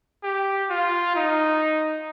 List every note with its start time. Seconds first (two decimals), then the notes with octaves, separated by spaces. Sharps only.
0.23 G4
0.70 F4
1.15 D#4